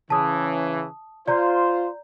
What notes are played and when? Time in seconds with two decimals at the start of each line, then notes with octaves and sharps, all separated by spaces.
0.10 C#3 E3 A5 D#6
1.28 F4 C5 D5 A#5 G6